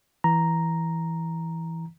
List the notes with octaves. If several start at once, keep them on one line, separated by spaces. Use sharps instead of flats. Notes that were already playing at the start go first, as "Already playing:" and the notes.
E3 A#5